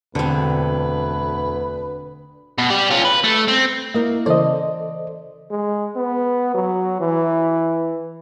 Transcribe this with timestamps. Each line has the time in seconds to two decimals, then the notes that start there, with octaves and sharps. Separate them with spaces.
0.15 E1 D2 D3 C4 B4
2.58 B2
2.70 G4 D5
2.90 C#4 F4
3.05 B4
3.24 A3
3.48 C4
3.94 A#3 E4 A#4 D#5
4.26 C#3 E3 A4 C5 D5 D#5
5.51 G#3
5.96 B3
6.54 F#3
7.01 E3